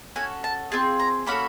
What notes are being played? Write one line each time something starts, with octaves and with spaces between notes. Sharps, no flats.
C#4 F#4 A4 G#5
A5
C4 F4 G#4 A5
A#5
A#3 C#4 F#4 A4 B5